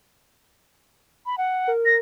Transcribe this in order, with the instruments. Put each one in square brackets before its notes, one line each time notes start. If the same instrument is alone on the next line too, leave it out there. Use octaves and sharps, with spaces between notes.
[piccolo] B5
F#5
[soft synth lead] A#4
[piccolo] A#6